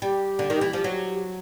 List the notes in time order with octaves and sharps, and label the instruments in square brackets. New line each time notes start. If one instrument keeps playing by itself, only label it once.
[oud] G3 [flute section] G4
[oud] D3
D#3
E3
F3
F#3